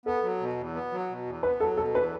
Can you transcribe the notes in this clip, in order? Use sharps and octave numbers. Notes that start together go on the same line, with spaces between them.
B3 A4
F#3
B2
E2
B3
F#3
B2
E2
B3 B4
F#3 A4
B2 A4
E2 B4